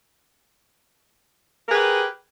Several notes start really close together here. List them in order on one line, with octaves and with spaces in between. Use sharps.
A#4 G#4 B4 G4